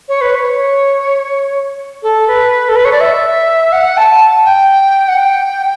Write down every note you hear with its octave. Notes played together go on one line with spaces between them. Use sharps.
C#5
B4
C#5
A4
B4
A4
B4
C#5
D5
E5
F#5
A5
G5
F#5
G5